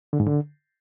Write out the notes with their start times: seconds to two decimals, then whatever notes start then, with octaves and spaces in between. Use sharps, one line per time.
0.13 D3
0.20 G#2
0.27 D3